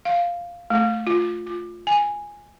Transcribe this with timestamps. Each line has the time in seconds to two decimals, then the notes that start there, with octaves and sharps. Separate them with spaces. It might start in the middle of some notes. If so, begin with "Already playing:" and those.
0.05 F5
0.70 A3
1.07 F4
1.46 F4
1.87 G#5